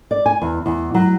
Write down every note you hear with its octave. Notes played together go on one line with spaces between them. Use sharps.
D5
G#5
E2
E2
F#3